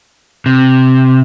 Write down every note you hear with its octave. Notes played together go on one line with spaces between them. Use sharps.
C3